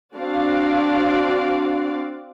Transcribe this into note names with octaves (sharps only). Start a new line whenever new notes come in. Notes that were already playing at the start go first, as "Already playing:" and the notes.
C4 D4 F#4 D5 F5